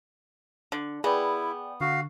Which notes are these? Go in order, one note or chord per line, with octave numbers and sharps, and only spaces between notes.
D3
B3 E4 G#4 D5 G5
D3 F#4 F5